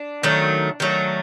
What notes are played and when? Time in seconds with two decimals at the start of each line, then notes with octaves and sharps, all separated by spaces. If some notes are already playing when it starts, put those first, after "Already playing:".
Already playing: D4
0.23 D#3 F#3 A3
0.80 D#3 F#3 A3